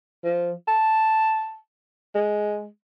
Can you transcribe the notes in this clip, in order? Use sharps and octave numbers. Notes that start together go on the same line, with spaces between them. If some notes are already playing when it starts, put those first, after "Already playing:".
F3
A5
G#3